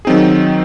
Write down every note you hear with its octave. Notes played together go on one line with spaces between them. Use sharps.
D#3 F#3 C4 D#4 G#4